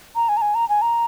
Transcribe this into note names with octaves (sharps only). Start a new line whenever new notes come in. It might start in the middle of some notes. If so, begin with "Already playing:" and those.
A#5
G#5
A#5
G#5
A#5
G#5
A#5